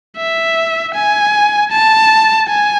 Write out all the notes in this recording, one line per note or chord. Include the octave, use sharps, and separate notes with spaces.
E5
G#5
A5
G#5